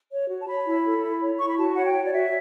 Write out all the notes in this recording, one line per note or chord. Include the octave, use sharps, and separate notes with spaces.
C#5
F#4
A5
C#5 B5
E4
A4
E4
C#5
E4 C#6
B5
F#4 A5
C#5 F#5
G5
C#5
D5
F#4 E5